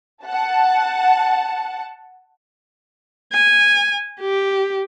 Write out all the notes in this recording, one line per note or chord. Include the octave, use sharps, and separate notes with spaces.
F#5 A5
G#5
G4